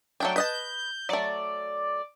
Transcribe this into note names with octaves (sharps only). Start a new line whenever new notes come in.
F#3 A3 D4 G5
B4 D#5 A5 G6
F#3 A3 D5